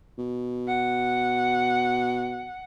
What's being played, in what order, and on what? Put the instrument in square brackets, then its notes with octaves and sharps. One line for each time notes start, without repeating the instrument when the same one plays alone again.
[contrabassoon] B2
[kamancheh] F#5